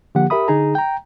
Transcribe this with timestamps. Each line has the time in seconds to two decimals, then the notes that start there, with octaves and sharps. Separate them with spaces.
0.15 D3 F3 A#3 G4 F#5
0.30 G4 A#4 E5 B5 D#6
0.48 D3 D#4 G#4 A#5
0.75 G5 A#5